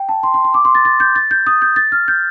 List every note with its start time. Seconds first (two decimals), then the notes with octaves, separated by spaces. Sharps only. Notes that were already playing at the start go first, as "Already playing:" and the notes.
Already playing: G5
0.09 A5
0.23 C6
0.34 C6
0.45 C6
0.54 D6
0.65 C6
0.75 A6
0.85 A6
1.00 G6
1.16 A6
1.31 G6
1.47 D#6
1.62 G6
1.76 A6
1.92 F6
2.08 G6